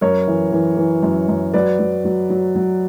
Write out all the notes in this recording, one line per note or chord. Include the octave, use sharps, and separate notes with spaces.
F#2 A#4 C#5
E3
E3
E3
F#2
F#2
F#3 B4 D5
F#3
F#3
F#3
F#3